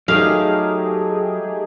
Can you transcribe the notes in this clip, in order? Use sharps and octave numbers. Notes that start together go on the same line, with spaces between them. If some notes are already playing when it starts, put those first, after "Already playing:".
F#3 A3 D#4 G4 G#4 A#4 F5